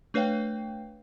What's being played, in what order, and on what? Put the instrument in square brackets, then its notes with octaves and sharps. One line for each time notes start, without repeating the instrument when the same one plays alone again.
[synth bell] A3 D4 B4 C#5 F5 G5